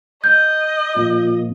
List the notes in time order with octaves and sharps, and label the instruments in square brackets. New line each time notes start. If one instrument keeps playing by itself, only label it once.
[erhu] D#5 [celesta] G6
[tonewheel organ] A#2 F3 A#3 [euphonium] F4